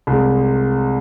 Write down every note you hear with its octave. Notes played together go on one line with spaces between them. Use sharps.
C2 C3 G#3